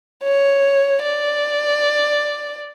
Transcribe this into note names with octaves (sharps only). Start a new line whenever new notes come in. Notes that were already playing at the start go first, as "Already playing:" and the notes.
C#5
D5